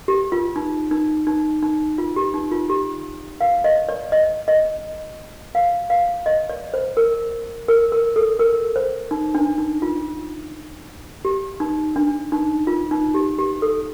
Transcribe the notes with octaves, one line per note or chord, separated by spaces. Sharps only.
G4
F4
D#4
D#4
D#4
D#4
F4
G4
D#4
F4
G4
F5
D#5
D5
D#5
D#5
F5
F5
D#5
D5
C5
A#4
A#4
A#4
A4
A#4
C5
D#4
D4
D#4
F4
G4
D#4
D4
D#4
F4
D#4
G4
G4
A4